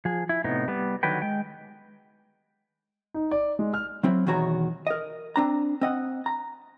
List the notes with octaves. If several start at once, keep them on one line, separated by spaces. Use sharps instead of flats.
F3 G#4
E4
A2 C3 B3 D#4
G3 B3
D3 D#3 F#3 B4 G5
G#3 G5
D#4
D5
G#3
F6
F#3 C4 E4
E2 B2 D#3 F#4 C#5 A#5
A#4 D#5
C4 D4 A#5
C4 D#5 F#5
A#5